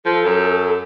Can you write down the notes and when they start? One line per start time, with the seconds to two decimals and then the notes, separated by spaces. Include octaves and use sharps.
0.05 F3 A4
0.25 F#2